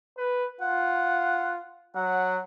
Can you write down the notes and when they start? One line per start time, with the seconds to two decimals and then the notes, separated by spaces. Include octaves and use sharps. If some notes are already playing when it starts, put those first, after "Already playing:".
0.18 B4
0.61 F4 F#5
1.95 F#3 F#5